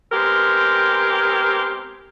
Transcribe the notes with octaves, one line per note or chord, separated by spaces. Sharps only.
G#3 B3 C4 G4 A#4